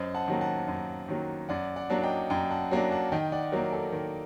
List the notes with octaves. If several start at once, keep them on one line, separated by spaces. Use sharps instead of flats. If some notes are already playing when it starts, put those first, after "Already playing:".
Already playing: F#2 C5 D#5
F#5 A5
D#3 F#3 A#3
F#5 A5
F#2
D#3 F#3 A#3
F#2 D5 F#5
D5 F#5
F#3 A#3 D4
D#5 G5
F#2 G5 A#5
F#5 A5
F#3 A#3 D4
F#5 A5
D#3 D#5 G5
D5 F#5
F#3 A#3 A#4
A4
D#3 A#4